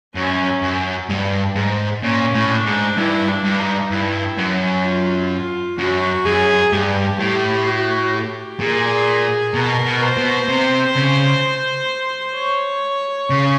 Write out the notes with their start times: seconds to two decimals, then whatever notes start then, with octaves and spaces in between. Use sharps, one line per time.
0.15 F#2 C#4
0.62 F#2
1.09 G2
1.56 G#2
2.02 A#2 C#4
2.34 A2
2.50 D4
2.66 G#2
2.97 G2 E4
3.28 D4
3.44 G2
3.60 D#4
3.90 G2 E4
4.37 F#2
4.84 F4
5.31 F4
5.78 F#2 F#4
6.25 F#2 G#4
6.72 G2 G4
7.19 A2 G4
7.66 F#4
8.13 G4
8.60 A#2 G#4
9.54 B2 A#4
9.85 B2
10.02 C5
10.17 B2
10.48 C3
10.95 C#3
12.36 C#5
13.30 C#3